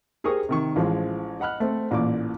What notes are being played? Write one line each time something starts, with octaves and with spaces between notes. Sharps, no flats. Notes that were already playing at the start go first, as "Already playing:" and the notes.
G4 G#4 A#4 C5 C#6 D#6
C3 D#3 C#6
A1 F3 G#3
D#5 F#5 B5 F6 F#6
A3 C4
A1 A#2 D5 D6